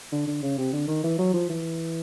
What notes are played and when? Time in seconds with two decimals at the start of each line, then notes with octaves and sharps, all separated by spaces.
0.12 D3
0.27 D3
0.42 C#3
0.58 C3
0.72 D3
0.88 D#3
1.04 E3
1.19 F#3
1.34 F3
1.50 E3